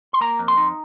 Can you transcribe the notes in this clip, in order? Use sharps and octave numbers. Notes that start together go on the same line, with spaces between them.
C6
A#3 A#5
F2
C6
D#4